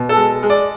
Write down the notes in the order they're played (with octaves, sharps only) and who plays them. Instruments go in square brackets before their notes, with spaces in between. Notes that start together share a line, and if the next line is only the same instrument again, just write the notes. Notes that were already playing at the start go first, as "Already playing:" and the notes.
Already playing: [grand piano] B2
A4
G#3
G#3
D5